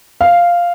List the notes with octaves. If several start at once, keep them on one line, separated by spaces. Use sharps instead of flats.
F5